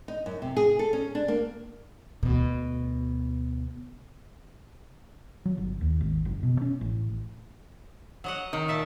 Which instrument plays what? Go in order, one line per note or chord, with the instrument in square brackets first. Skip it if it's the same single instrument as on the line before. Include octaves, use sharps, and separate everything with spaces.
[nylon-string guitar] D#4
F#2
C3
G#4
A4
C#4
D4
A#3
[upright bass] D2 B2
[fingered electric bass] F#3
G1
D#2
G#1
F#1
B2
C#4
A1
[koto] F#3 D#5 F#5
[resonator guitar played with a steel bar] D#3
[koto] A#2 E5 A5